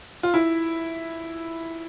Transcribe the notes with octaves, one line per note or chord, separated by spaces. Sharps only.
F4
E4